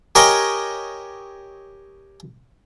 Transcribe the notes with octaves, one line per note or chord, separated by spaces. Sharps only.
G4 A#4 C#5 D#5 G5 G#5